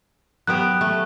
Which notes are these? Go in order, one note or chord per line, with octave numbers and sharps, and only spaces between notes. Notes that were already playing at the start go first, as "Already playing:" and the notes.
F#3 B3 G4 F#6
A3